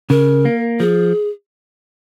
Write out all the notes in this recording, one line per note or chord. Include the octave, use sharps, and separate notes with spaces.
C#3 A#4
A#3
F3 G#4